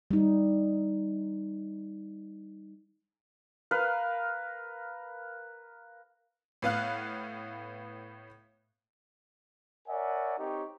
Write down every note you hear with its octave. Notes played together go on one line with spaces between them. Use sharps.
G3 D#4
A#4 B4 F5
A2 B3 F5 F#6
A#4 C#5 D5 E5 F#5 G#5
C4 D#4 G4 C#5